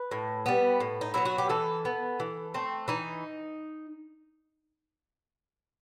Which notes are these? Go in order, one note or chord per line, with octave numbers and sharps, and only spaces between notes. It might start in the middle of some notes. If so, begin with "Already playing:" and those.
Already playing: B4
A2
G3 B3
A2
D#4
F#3 B3 E4
F#4
G4
E3 A4
B3
E3
A3 C4
E3 D#4